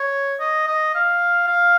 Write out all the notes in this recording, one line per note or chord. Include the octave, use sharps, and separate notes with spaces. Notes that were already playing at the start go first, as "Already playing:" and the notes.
Already playing: C#5
D#5
D#5
F5
F5